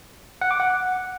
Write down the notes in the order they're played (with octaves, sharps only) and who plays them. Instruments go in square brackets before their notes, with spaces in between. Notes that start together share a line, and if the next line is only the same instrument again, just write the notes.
[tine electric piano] F#5
D6
F#5